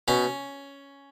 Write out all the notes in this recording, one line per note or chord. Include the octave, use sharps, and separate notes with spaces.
B2 C#4